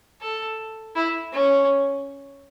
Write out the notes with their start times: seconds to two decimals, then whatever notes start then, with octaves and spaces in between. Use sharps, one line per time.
0.21 A4
0.96 E4
1.33 C#4